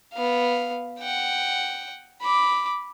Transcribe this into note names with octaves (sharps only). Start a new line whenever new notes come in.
B3 F5
F#5 G5
B5 D6